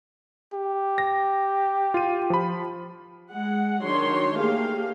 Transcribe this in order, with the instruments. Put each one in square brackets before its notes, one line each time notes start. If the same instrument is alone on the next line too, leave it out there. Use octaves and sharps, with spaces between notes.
[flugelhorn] G4
[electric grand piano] A#6
F4 D#7
F3 B5
[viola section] G#3 F#5
D#3 F#3 D4 C#5 C6
A3 A#3 G4 G#4 F5